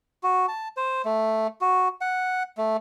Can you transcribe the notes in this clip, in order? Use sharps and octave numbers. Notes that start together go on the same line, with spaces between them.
F#4
A5
C5
A3
F#4
F#5
A3